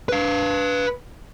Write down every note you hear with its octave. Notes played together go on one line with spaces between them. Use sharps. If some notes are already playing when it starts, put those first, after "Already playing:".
B4 F5